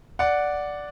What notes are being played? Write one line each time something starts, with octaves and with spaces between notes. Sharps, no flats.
D5 F#5